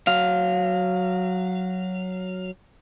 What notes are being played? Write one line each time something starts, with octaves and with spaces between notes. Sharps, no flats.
F#3 F5